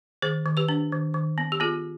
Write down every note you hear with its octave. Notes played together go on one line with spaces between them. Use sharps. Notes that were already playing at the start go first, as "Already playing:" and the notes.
D#3 G#4 C5
D#3
G4 B4
D4
D#3
D#3
B3
G4
B3 F4 G#4